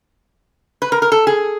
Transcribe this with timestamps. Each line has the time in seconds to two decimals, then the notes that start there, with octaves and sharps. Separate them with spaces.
0.82 B4
0.92 A#4
1.02 A#4
1.12 A4
1.27 G#4